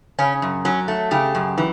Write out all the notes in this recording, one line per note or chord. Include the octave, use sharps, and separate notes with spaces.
C#3 C#4
F#2
F#3 C#4
A3
C#3 G4
F#2
E3